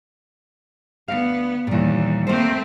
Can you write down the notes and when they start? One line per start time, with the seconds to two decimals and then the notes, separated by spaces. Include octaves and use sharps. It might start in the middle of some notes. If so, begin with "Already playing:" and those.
1.08 D2 B3 F5
1.67 D#2 A#2 E3 G3
2.27 A3 A#3 C4 C5